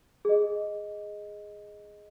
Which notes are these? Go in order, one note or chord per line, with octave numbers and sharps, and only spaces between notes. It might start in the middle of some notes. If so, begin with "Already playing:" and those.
G#4 D#5